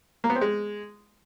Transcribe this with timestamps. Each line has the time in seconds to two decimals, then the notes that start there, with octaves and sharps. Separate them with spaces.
0.24 A#3
0.30 B3
0.36 C4
0.41 G#3